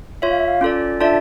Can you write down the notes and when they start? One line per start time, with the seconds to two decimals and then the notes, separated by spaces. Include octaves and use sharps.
0.22 F4 C#5 E5
0.30 F5
0.39 E5
0.47 F5
0.61 C#4 F4 A4 D5
1.01 D4 F4 A4 D5 E5 A5